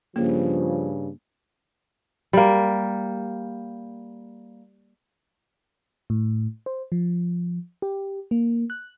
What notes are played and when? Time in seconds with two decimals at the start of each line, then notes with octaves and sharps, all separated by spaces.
0.16 G2 C#3 F3 A#3
2.33 G3 A#3
6.10 A2
6.66 C5
6.92 F3
7.82 G4
8.31 A#3
8.70 F#6